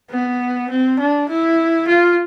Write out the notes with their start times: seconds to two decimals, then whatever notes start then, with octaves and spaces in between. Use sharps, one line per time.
0.11 B3
0.70 C4
0.99 D4
1.29 E4
1.88 F4